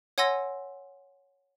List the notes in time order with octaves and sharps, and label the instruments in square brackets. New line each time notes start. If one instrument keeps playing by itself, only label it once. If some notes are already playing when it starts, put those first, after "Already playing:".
[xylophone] C#5 F#5 G#5 C6 E6 A#6